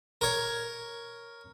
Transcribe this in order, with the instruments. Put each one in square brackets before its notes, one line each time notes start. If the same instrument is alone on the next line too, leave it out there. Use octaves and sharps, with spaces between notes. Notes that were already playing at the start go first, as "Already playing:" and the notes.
[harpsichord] A#4 C#5